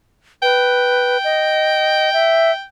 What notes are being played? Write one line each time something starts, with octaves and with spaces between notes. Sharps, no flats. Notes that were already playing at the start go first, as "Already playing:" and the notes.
B4 G5
D#5
E5